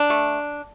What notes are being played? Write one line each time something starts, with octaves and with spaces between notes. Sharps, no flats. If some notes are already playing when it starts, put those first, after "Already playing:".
Already playing: D4
A3